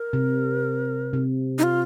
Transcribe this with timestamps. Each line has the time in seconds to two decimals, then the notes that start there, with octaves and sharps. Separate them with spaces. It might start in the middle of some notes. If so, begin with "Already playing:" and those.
Already playing: A#4
0.13 C3
1.13 C3
1.58 D#4
1.63 F4